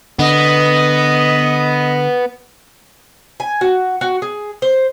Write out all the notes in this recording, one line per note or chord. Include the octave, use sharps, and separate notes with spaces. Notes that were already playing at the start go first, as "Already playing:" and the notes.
D3 B3 D#5
G#5
F#4
F#4
G#4
C5